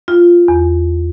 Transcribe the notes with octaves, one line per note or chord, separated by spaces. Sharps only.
F4
E2